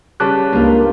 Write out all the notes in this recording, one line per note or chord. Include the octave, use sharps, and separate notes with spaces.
C#3 G3 B4 A5 D6 F#6
C#2 G2 A#3 F4